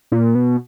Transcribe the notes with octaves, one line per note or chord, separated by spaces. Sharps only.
A#2
B2